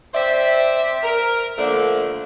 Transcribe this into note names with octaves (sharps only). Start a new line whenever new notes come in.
C4 C5 D5 E5
A#4
D3 F3 A3 A#3 D4